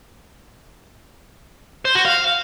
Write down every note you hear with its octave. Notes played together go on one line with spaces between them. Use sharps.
C5
F#4
F5